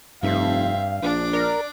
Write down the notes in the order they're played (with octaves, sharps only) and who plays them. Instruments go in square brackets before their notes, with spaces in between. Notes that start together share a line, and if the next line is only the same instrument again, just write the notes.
[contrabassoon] F1 [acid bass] G2 [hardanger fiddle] C4 E5 [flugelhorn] F5
[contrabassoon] A#1 [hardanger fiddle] D4 D6
[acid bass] A#4 [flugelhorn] D5